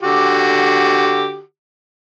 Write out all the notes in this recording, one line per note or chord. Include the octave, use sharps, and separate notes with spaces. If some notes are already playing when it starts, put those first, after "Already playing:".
D3 F#4 G4